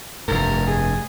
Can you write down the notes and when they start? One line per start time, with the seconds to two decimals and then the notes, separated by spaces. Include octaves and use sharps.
0.28 F1 G2 A#4
0.68 G#4